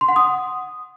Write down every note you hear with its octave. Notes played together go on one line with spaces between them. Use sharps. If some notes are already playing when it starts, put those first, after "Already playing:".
C6
F#5
D#6